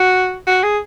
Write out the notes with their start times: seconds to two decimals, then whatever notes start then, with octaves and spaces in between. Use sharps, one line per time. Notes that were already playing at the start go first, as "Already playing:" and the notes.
Already playing: F#4
0.47 F#4
0.63 G#4